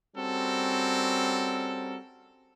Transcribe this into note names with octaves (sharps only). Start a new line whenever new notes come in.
G3 C4 C#4 F#4 A4 A#4